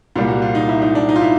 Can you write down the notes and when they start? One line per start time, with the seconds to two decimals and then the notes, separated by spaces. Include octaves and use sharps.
0.16 C2 A#2 G3 A#3 F4
0.29 F#4
0.42 F4
0.55 D#4
0.69 E4
0.82 D#4
0.95 D4
1.09 D#4
1.16 F4
1.22 E4